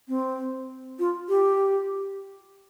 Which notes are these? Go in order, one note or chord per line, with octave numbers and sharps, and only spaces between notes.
C4
F4
G4